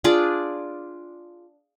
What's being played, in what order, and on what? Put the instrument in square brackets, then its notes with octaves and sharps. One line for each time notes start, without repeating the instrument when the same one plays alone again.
[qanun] D4 F4 G#4 D5